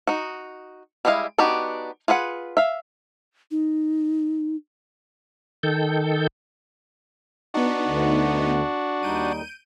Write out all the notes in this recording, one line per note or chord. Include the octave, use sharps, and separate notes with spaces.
D#4 F#4
G3 G#3 E4 D#5 F5
B3 D4 D#4 F#4 G4
F4 G#4 B4 F#5
E5 F5
D#4
D#3 A4 G6
B3 D4 D#4 F#4
D2 D3
D#2 G3 D#4 G6 D7 D#7